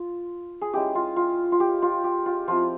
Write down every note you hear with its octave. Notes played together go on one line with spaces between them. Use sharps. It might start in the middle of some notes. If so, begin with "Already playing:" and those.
Already playing: F4
G#4
G#3 C#4 E4 G4
F4
F4
F4
G4
F4
G4
F4
F3 C4 E4 F4